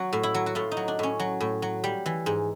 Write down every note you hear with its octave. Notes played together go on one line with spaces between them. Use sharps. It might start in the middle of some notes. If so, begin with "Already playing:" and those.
Already playing: F#3 F#4
A2
E4
F#3
F#4
A2 F4
D#4
F#3
D4
A2 C#4
F#3
A2
F#3
G3
E3
G#2